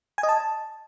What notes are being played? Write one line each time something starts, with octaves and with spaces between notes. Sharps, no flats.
G#5
D#5
A5